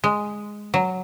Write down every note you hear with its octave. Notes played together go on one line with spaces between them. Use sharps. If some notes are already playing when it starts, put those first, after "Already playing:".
G#3
F#3